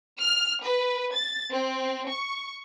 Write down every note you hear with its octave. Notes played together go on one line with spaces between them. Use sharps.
F6
B4
A6
C4
C#6